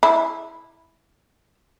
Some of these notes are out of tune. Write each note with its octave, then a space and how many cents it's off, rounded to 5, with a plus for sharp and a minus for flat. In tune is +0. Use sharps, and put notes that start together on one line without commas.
E4 +0